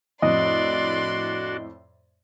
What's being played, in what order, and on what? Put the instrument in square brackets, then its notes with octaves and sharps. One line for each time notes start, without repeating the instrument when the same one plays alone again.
[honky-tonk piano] F2 A2 [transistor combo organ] D4 F#4 [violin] D5 C6 [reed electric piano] D#5